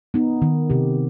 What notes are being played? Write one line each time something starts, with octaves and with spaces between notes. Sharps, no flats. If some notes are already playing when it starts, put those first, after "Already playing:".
B3 D#4
D#3
C3 G4